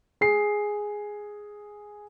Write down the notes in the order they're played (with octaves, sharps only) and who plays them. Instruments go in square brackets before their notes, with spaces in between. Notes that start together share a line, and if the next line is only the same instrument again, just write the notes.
[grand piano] G#4 C7